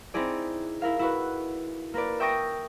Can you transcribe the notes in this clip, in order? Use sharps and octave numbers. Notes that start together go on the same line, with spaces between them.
C4 D#4 E4 G#4 D5
E4 A#4 F5
E4 F#4 B4
A#3 A#4 B4 D5
E5 G5 C#6 D#6 A#6 D7